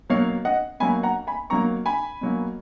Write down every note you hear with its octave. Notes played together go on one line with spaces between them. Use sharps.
B2 F#3 A#3 C#5 F5
D#5 F#5
B2 F#3 A#3 G#5 B5
F#5 A#5
G#5 B5
B2 F#3 A#3 A#5 C#6
G#5 B5
B2 F#3 A#3